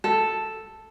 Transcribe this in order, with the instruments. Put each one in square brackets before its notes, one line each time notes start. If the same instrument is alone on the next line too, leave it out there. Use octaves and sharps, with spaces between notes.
[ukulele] A4